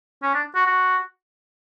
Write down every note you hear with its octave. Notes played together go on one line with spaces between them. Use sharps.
C#4
D4
F#4
F#4